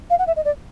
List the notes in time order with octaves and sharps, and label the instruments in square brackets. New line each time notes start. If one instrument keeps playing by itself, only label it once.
[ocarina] F5
F#5
E5
D#5
D5